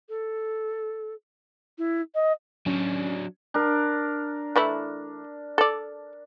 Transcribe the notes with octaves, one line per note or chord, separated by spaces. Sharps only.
A4
E4
D#5
F#3 C#4 D4
D4 A#4
E3 A3 E4
A4 D5